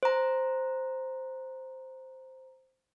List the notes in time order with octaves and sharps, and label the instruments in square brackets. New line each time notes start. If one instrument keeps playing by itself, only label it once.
[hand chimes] C5 A#5